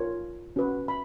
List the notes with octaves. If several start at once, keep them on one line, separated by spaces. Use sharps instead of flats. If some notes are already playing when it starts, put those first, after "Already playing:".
Already playing: F4 A#4 C#5
C#4 F#4 B4
B5